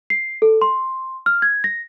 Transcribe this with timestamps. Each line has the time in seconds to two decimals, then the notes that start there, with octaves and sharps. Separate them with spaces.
0.10 C7
0.42 A4
0.62 C6
1.26 F6
1.42 G#6
1.64 A#6